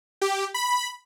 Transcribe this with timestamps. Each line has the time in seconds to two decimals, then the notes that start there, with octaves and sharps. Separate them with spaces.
0.21 G4
0.54 B5